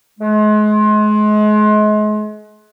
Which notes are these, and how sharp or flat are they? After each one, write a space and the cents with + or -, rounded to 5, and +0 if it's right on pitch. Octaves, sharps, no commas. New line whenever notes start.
G#3 +35